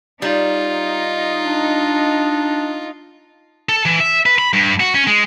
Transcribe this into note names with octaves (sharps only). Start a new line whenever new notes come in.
G3 D#4 F4
D4
A4
E3
E5
B4
B5
G2
F#4
C#4
G#3